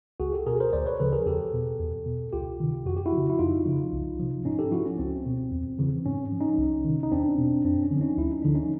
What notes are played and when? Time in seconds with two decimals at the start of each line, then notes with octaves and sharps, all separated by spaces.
0.20 C#2 F#4 G#4
0.33 G4 A4
0.46 B2 G#4 A#4
0.60 A#4 C5
0.73 D2 C5 D5
0.86 B4 C#5
1.00 C#3 F3 A4 B4
1.13 G#4 A#4
1.26 E2 G4 A4
1.53 B2
1.80 E2
2.06 B2
2.33 C#2 F4 G4
2.60 C3 D#3
2.86 F2 F#4
2.96 G4
3.06 E4 F#4
3.12 F3
3.17 C#3
3.30 E4
3.39 F2 D#4 F4
3.65 C#3 F3
3.93 C2
4.19 C3 F3
4.45 G#2 C#4 D#4
4.59 G4 A4
4.72 F3 E4 F#4
4.85 C#4
4.98 C#2 C4
5.26 B2
5.52 E2
5.78 C#3 E3
6.06 G#2 C#4
6.32 F3
6.40 C#4 D#4
6.58 C2
6.85 C3 D#3
7.03 D#4
7.12 E2 C4 D4
7.39 B2
7.65 F2 C4 D4
7.83 C#4
7.91 D3 F3
8.01 C#4 D#4
8.18 D2 E4
8.31 D#4
8.43 D3 F3 D4
8.55 C#4 D#4